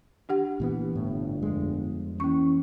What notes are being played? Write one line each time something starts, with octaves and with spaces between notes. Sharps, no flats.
D4 G4 F#5
A#2 E3 B3
G1 A2
F2 G#3
E3 A#3 C#4 C#6